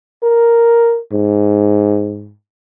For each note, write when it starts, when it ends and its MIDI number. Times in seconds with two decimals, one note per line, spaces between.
0.23 0.99 70
1.12 2.34 44